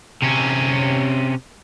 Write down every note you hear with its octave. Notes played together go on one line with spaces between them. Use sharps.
C3 C#4